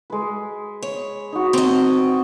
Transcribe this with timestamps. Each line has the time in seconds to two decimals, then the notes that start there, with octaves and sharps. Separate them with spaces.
0.10 G#3 B4
0.82 C#5
1.32 D#4 F#4
1.53 C4 D#5